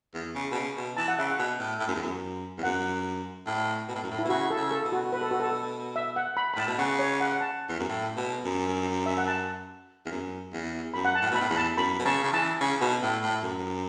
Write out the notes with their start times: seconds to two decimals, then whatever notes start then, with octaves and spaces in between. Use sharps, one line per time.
0.15 E2
0.35 C#3
0.52 B2
0.55 C#3
0.77 B2
0.97 E3 A5
1.08 F#5
1.18 C#3 E5
1.31 F#5
1.39 B2
1.59 A2
1.80 A2
1.88 F#2
1.95 E2
2.02 F#2
2.58 E2
2.63 F#2 F#5
3.47 A2
3.89 B2
3.95 A2
4.03 F#2
4.11 A2
4.19 E4
4.25 B2
4.29 C#3 F#4
4.50 A4
4.57 C#3
4.71 A4
4.85 B2
4.92 F#4
5.13 B4
5.21 A4
5.31 F#4
5.40 A4
5.96 E5
6.16 F#5
6.37 B5
6.54 B5
6.57 A2 A5
6.67 B2
6.79 C#3 F#5
6.99 C#5
7.20 F#5
7.32 F#5
7.41 A5
7.69 E2
7.80 F#2
7.89 A2
8.17 B2
8.45 F#2
9.06 E5
9.17 F#5
9.27 A5
10.06 E2
10.11 F#2
10.53 E2
10.94 F#2 B5
11.05 F#5
11.15 A5
11.22 A2
11.31 B2 B5
11.41 A2
11.50 E2 B5
11.57 A5
11.77 F#2 B5
11.99 B2
12.05 C#3 A5
12.24 C#3
12.33 E3 A5
12.61 C#3
12.81 B2
13.03 A2
13.22 A2
13.43 F#2